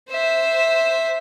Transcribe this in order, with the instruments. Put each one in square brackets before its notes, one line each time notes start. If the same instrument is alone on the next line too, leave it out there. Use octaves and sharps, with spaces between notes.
[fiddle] C5 E5